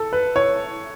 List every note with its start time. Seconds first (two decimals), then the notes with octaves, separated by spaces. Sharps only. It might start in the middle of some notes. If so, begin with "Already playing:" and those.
Already playing: A4
0.13 B4
0.36 C#5